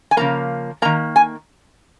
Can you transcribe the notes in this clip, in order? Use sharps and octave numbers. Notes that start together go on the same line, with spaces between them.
G#5
C#3 F3 A#3 A#5
D#3 A#3 A#5
G#5